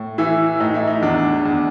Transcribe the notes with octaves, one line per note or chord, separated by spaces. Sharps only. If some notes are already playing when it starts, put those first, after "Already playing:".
Already playing: A2
E3 E4
A2 D#4
E4
D#4
E2 D4
E2